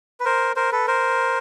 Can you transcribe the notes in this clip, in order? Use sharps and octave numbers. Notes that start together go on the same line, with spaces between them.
B4
A#4 C5
A#4 C5
A4 B4
A#4 C5